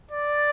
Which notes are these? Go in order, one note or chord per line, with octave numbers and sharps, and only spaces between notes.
D5